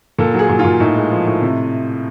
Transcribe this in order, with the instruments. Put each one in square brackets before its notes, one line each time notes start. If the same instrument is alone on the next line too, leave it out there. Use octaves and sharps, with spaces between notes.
[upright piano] A#2 A4
F#3
G#4
A#2
F4
A#2
A2 D#4
G#3
F3
A2
C3